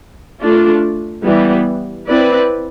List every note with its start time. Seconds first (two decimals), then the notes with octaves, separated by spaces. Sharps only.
0.41 A3 D4 F4
1.24 E3 G3 B3
2.08 C4 E4 B4 D5